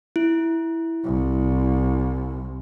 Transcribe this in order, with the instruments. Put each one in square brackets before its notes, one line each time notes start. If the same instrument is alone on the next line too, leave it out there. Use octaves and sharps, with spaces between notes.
[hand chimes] E4
[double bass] C2